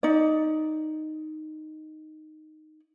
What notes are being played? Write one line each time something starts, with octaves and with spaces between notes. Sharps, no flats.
D#4 D5